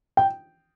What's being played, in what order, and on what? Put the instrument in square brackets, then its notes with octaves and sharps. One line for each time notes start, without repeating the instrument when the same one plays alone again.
[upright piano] G5